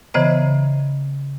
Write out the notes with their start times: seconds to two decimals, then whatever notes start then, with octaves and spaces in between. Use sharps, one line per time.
0.14 C#3 E3 B3 C5 D#5 A#5